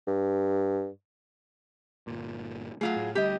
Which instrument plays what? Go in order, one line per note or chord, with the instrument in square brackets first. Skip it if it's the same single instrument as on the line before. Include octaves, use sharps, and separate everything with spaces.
[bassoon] G2
[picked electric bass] G1 A#2
[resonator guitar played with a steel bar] F#3 F4 G#4 [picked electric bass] A3
[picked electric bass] A2
[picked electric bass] D2 G3 [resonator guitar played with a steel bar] G4 D#5